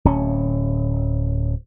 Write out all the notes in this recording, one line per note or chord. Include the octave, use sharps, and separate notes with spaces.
D1 C#4